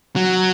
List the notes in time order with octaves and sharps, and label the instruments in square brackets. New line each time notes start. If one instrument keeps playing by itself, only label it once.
[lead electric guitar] F#3